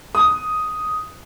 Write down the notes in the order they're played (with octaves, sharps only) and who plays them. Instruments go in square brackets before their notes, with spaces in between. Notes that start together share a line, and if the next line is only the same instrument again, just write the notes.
[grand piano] D#6